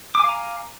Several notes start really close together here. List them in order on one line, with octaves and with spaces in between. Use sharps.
D6 G#5 F5 A#5